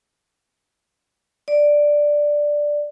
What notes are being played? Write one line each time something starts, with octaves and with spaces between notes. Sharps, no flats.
D5